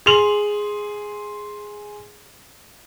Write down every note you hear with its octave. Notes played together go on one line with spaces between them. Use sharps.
G#4 C6 F7 F#7